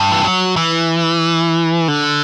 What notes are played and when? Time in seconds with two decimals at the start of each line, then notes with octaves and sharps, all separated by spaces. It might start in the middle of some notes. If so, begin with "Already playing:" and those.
Already playing: G2
0.12 E3
0.24 F#3
0.57 E3
1.88 D3